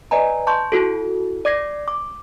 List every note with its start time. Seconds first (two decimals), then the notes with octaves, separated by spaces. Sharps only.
0.11 B4 D5 D#5 G#5 A#5
0.47 A5 C6 C#6 G6
0.72 E4 F#4 A4
1.45 D5 D6 G#6 A#6 C7
1.88 D6